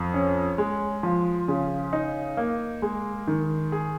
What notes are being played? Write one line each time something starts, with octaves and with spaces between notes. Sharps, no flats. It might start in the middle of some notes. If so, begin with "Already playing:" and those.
Already playing: F2
C#4
G#3
F3
C#3
D#4
A#3
G#3
D#3
G#4